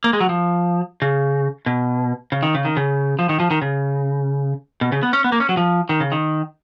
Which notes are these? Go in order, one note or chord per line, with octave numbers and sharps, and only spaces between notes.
A#3
G#3
F#3
F3
C#3
B2
C#3
D#3
C#3
D#3
C#3
F3
D#3
F3
D#3
C#3
B2
C#3
B3
C#4
B3
A#3
C#4
F#3
F3
D#3
C#3
D#3